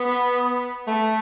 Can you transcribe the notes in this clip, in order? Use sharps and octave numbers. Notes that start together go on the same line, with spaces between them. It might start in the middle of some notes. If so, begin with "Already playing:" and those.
Already playing: B3
A3